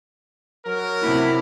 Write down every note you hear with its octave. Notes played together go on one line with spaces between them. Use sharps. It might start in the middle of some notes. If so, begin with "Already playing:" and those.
F#3 A#4
C3 E4